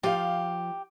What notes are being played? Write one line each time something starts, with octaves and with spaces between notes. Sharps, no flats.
F3 G4 F5